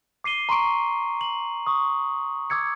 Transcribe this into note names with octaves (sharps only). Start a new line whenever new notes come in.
D6 C7 D#7 G7
A#5 C6 C#6 D7
F#7
C#6 D#6
D6 E6 G#6 C#7